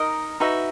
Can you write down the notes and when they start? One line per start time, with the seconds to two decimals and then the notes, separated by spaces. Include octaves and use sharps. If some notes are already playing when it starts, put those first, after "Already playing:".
Already playing: D#4 A#4 D#5
0.40 D#4 F#4 B4 E5